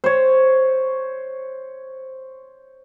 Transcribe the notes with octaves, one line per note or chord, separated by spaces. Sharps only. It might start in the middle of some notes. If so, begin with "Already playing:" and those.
C5 C#5